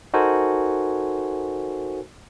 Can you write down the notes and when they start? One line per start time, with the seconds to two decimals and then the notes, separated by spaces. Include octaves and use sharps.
0.14 D#4 F#4 A4 A#4 C5 G#5